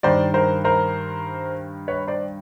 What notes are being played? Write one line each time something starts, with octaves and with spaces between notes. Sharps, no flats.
G2 D#3 C5 D5
A#4 C5
A#4 C5
B4 C#5
C5 D5